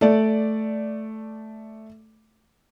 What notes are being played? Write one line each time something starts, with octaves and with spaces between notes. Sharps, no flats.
A3 D5